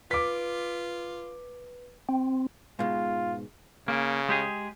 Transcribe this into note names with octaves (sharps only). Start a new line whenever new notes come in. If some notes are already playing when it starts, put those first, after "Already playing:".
F4 B4 D6 B6
C4
G#2 B2 G#3 F4
C#3 A#3
G#3 G4 G#4